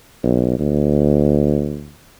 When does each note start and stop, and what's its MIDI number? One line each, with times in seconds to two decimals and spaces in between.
0.23 0.54 35
0.59 1.93 38